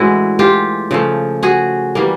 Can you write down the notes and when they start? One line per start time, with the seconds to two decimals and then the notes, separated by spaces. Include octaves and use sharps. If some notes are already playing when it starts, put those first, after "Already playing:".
Already playing: A2 E3 G#3 C#4 E4 F#4
0.39 F4 G4
0.91 C#3 F3 A3
1.43 F#4 G#4
1.95 E3 G3 A#3